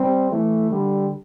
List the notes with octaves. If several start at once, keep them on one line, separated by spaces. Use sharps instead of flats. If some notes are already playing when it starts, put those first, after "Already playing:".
Already playing: G3 C4
E3 A3
D3 G3